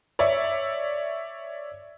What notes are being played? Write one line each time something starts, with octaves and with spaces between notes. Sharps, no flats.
C#5 D5 E5